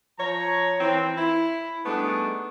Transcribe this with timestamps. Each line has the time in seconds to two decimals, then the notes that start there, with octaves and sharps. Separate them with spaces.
0.19 F3 C#5 A#5
0.80 E3 C4
1.16 E4
1.86 G3 A3 B3 D4 D#4 G#4